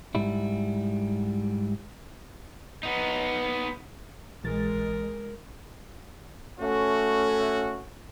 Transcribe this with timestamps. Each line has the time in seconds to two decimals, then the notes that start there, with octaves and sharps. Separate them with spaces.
0.15 G#2 G3 E4
2.83 B3 D#4
4.44 A#1 E3 G#3 A#4 A6
6.60 A3 C#4 F#4